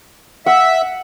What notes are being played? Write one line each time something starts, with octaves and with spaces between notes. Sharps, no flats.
E5 F#5